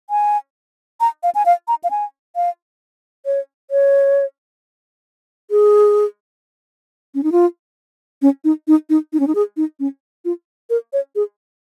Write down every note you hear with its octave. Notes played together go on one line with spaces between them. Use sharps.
G#5
A#5
F5
G#5
F5
A#5
F5
G#5
F5
C#5
C#5
G#4
C#4
D#4
F4
C#4
D#4
D#4
D#4
D#4
C#4
D#4
G#4
D#4
C#4
F4
A#4
C#5
G#4